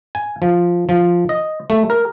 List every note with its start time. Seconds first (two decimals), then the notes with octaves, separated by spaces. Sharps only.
0.15 G#5
0.42 F3
0.89 F3
1.29 D#5
1.70 A3
1.90 A#4